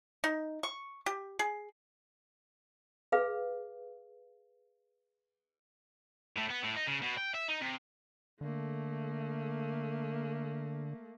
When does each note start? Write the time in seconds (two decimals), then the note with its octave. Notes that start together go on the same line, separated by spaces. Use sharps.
0.24 D#4
0.63 C#6
1.06 G4
1.39 G#4
3.12 G#4 B4 F5
6.36 A2
6.50 B3
6.63 A2
6.76 D#4
6.87 C#3
7.02 B2
7.17 G5
7.34 E5
7.48 D#4
7.61 C3
8.41 D3 A3 A#3